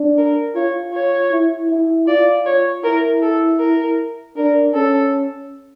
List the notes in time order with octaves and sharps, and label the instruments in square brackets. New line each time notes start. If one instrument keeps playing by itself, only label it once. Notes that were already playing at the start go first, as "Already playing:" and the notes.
Already playing: [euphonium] D4
[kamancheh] A#4
[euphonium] F4 [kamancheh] C#5
[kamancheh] C#5
[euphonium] E4
E4
[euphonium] F4 [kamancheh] D5
[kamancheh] C#5
[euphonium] E4 [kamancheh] A#4
[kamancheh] A4
A#4
[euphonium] D4 [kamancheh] A#4
[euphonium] C#4 [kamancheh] A4